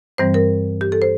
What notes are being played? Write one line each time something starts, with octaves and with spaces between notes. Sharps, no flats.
G2 E3 G3 C4 C5
A#4
G4
A4
C5